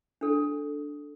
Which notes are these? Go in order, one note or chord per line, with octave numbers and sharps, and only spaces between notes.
D4 A4